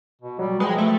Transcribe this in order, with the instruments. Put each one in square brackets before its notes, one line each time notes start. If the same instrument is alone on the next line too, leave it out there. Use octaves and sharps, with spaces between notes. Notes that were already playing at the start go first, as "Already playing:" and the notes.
[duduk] B2
[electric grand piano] F#3 [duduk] G3
[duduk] F3 [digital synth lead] G#3 [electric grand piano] B4 G5
[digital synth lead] A3